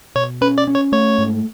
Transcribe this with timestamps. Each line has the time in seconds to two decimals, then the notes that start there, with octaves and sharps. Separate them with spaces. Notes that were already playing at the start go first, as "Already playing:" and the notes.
0.15 B2 C#5
0.41 C#4 B4
0.58 D5
0.67 C#4
0.75 C#5
0.92 A3 C#5
1.18 G#2